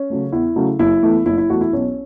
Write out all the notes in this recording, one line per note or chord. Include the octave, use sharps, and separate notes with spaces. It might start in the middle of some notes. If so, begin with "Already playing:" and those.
Already playing: C#4
C#3 F#3 A3
E2 E4
C#3 F#3 A3
F#1 E4
E2 E3 A3
F#1 E4
E4
E2 E3 A3 F#4
E4
B1 C#4